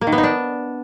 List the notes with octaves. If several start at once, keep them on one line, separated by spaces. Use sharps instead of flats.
A#3
D#3
B3
D#4
D4